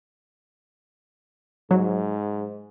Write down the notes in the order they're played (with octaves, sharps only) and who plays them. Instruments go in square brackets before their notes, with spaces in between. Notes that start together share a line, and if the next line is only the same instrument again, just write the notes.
[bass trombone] G#2 [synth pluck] F#3